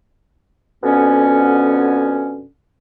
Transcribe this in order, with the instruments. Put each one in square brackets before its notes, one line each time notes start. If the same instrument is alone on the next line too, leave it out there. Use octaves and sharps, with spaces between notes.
[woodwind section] F2 B2 D3 B3 C#4